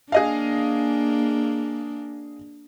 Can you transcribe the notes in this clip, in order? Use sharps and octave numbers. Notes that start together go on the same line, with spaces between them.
A#3 D4 G#4 D#5 F5